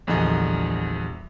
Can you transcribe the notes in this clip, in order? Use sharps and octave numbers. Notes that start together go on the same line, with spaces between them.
A#1 E2 D3 G3 D#5 G#5